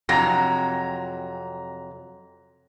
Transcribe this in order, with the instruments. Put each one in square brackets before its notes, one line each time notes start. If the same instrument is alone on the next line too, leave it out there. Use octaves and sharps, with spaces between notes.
[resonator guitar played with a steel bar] F2 C3 F#3 [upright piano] A#5 A#6